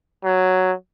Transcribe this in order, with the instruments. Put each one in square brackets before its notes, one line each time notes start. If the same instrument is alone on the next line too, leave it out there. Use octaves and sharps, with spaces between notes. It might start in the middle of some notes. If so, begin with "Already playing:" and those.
[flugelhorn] F#3